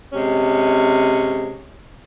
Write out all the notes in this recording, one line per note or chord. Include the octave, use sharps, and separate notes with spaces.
C3 G#3 C#4